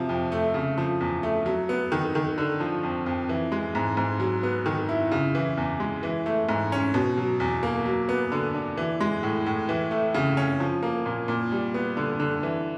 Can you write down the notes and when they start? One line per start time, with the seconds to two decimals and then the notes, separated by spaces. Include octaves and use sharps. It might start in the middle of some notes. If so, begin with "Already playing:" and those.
Already playing: C3 F3
0.09 F2
0.32 A3
0.54 C#3
0.78 F3
1.01 E2
1.23 A3
1.46 F#3
1.69 B3
1.92 D#3
2.15 D#3
2.38 D3
2.60 F3
2.83 F2
3.06 F2
3.29 E3
3.52 G#3
3.75 G#2
3.97 G#2
4.20 F#3
4.43 B3
4.66 D#3
4.89 E4
5.12 C#3
5.35 E3
5.57 E2
5.80 G#3
6.03 E3
6.26 A3
6.49 G#2
6.72 C#4
6.94 B2
7.18 F#3
7.40 E2
7.63 A#3
7.85 F#3
8.09 B3
8.32 D3
8.54 D4
8.77 E3
9.00 G#3
9.23 A2
9.46 A2
9.69 E3
9.91 A3
10.14 C#3
10.37 C#4
10.60 F3
10.83 A#3
11.06 A#2
11.28 A#2
11.52 G3
11.74 B3
11.97 D3
12.20 D3
12.43 E3